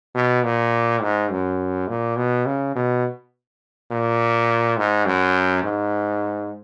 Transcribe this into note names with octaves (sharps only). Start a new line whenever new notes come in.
B2
A#2
G#2
F#2
A#2
B2
C#3
B2
A#2
G#2
F#2
G#2